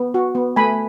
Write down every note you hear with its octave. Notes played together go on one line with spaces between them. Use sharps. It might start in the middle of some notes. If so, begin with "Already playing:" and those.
Already playing: B3
F#4
B3
A3 G#5 B5